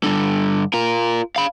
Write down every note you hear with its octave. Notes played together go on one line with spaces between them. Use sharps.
G2 D3
F4 A#4
F5 B5